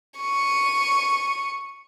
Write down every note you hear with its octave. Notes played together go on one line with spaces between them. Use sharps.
C#6 D#7